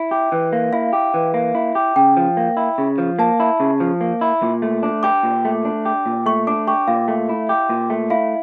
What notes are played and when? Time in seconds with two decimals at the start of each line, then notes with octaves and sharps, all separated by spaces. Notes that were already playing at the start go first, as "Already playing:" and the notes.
Already playing: E4 E5
0.11 G4
0.32 E3
0.53 A#3
0.73 E4 F5
0.93 G4
1.14 E3
1.34 A#3
1.55 E4
1.75 G4
1.96 C#3 G5
2.17 F3
2.37 A#3
2.57 E4
2.78 C#3
2.98 F3
3.19 A#3 A5
3.40 E4
3.60 C#3
3.80 F3
4.01 A#3
4.21 E4
4.42 A#2
4.62 A3
4.83 D4
5.03 G4 D6
5.23 A#2
5.45 A3
5.65 D4
5.85 G4
6.06 A#2
6.26 A3 C#6
6.47 D4 D6
6.67 G4 C#6
6.88 A#2 F5
7.08 A3
7.29 E4
7.49 G4
7.69 A#2
7.90 A3
8.10 E4 F5